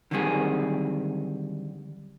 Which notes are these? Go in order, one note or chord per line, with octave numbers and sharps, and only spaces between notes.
D3 D#3 F#3 G3 C4 G#4